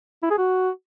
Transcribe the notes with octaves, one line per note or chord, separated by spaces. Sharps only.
E4
G#4
F#4